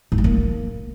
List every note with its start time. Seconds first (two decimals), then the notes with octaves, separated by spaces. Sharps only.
0.12 G#2
0.18 G3
0.24 A#3